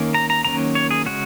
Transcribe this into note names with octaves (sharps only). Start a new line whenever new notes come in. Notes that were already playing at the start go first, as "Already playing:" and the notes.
Already playing: D#3 A#3 C#4
A#5
A#5
D#3 F#3 A#3 C#4 A#5
C#5
G#4
C#3 G#3 C#4 F#4